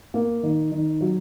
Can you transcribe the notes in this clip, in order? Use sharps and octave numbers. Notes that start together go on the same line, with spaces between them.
A#3
D#3
D#3
F#3